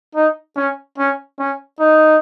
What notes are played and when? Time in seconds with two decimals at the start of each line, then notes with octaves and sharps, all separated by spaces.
0.15 D#4
0.56 C#4
0.98 C#4
1.39 C#4
1.80 D#4